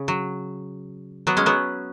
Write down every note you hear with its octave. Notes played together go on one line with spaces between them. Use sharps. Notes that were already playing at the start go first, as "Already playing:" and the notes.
Already playing: C#3
F#3
F#3 B3
G#3 C#4
F#3 B3